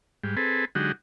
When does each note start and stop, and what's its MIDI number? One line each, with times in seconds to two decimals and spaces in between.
0.24 0.36 44
0.24 0.36 55
0.37 0.65 60
0.37 0.65 68
0.37 0.65 69
0.37 0.65 71
0.75 0.92 50
0.75 0.92 54
0.75 0.92 56
0.75 0.92 63
0.75 0.92 66
0.75 0.92 67